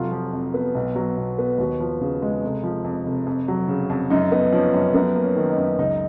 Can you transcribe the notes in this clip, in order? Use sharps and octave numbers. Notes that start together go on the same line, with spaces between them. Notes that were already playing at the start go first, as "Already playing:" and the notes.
Already playing: F1 F#3 F4
F3
F2
B3
B1
F#3
B2
B3
D#2 F#4
F3
C#3
G#3
F1
F3
F2
F1
F2
F#3
C#3
F2
F#2 D#4
B3 D#4
F3 C#4
F#2 C#4
F#2 B3
A#3
C#4
D#3
D#4
F#2
C#2 D#4